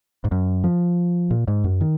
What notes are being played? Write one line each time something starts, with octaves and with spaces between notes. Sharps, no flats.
G#2
F#2
F3
A#2
G#2
F#2
D#3